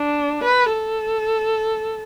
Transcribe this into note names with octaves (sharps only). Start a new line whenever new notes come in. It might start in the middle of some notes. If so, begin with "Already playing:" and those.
Already playing: D4
B4
A4